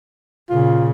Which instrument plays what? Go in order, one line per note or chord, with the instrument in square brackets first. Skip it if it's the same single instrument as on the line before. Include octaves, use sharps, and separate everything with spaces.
[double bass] A#2 C#3 [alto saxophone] F4